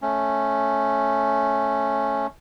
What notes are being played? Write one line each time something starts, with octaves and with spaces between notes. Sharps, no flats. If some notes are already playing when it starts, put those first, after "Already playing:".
A3 C#4